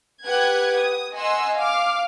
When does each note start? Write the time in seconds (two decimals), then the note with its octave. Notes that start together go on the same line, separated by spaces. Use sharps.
0.25 G4 B4 F#5 F#6 G#6
0.78 D#6
1.14 D#5 F#5 G#5 C6 E6
1.57 F5 D6 F6